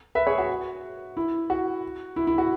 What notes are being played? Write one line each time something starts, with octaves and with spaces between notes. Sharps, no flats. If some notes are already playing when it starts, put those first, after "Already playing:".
B4 E5
G#4 C#5
F#4
E4
F#4
E4
E4
F#4